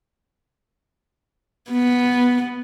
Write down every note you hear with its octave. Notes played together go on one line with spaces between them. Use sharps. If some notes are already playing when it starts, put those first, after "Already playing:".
B3